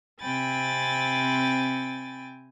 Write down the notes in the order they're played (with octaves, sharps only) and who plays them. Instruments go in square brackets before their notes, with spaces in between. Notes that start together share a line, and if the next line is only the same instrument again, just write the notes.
[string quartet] C3 C4 G5 G#5 B5 A6